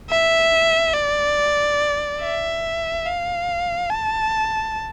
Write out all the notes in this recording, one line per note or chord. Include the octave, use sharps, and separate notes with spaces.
E5
D5
E5
F5
A5